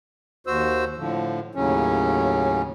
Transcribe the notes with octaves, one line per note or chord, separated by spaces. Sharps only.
D#2 F#4 C5 E6
A2 D3 F3
D#2 A2 C#3 F#3 C#4